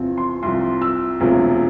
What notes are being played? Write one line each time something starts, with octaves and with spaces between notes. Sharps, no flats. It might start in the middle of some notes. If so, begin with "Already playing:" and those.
Already playing: E2 C3 F3 C4
C6
C2 C3 F3 C6
E6
E1 D2 C3 F3